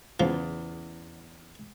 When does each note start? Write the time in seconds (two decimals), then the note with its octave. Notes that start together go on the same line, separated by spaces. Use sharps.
0.20 E2 C#3 E3 F3